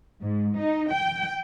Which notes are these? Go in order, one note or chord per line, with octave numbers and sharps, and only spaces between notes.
G#2
D#4
G5